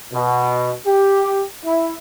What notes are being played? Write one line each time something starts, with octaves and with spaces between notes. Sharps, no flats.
B2
G4
E4